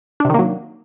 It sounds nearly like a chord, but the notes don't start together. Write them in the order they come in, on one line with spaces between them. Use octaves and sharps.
D4 C3 D#3 A#3 F#3